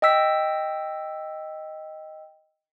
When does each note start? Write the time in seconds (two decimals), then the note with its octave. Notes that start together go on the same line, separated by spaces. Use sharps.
0.02 D#5 G5 E6 B6